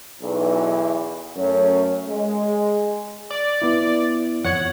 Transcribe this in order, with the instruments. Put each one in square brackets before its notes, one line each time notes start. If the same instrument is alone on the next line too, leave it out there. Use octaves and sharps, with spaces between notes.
[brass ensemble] B1 E2
F#2 A3 C#4 C#5
G#3
[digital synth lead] D5
[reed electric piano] B3 E4
[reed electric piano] F2 C#5 G#6 [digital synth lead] F#5